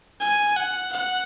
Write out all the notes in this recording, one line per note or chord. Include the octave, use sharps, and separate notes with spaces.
G#5
F#5
F#5